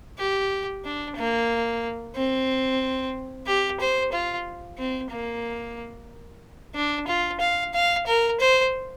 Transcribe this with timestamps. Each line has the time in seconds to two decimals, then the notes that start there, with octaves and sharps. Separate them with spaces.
0.19 G4
0.85 D4
1.16 A#3
2.15 C4
3.47 G4
3.80 C5
4.12 F4
4.78 C4
5.10 A#3
6.75 D4
7.07 F4
7.40 F5
7.73 F5
8.07 A#4
8.40 C5